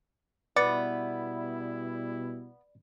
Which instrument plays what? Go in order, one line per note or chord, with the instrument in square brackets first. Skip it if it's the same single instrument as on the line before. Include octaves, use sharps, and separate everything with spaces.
[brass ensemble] B2 G3 E4 [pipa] B3 [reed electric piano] D5 [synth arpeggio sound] D6 A6 C#7